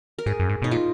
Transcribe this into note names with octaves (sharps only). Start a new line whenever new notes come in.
A#4
G#2 G#4
F#2
G#2
B2 D#4
A#2 F4